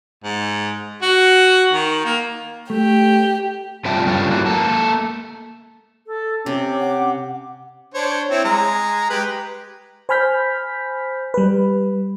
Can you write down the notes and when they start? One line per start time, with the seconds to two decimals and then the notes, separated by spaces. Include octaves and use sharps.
0.24 G#2
1.02 F#4
1.73 D#3
2.05 A#3
2.70 A3 G4
3.85 C3 G3 F4 E5 G5 A5
4.06 G2 C#3 G3 F4 A4 C#5
4.30 F#3 A#3 E4 F#4
4.46 A#3 A4
6.07 A4
6.46 C3 C#4 D6
6.81 F#5
7.94 D4 C5 C#5
8.31 C4 E4 C#5
8.45 G#3 A#5
9.10 G#3 G4 B4
10.09 C5 G#5 B5 F6 G6 B6
11.34 G3 B4